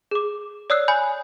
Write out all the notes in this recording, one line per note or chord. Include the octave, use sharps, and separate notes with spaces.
G#4 D6
C#5 D5 D#6 E6 F#6 C7
G#5 B5 G6